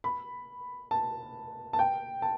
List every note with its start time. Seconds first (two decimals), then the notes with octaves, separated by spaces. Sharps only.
0.04 B5
0.91 A5
1.73 A5
1.79 G5
2.22 A5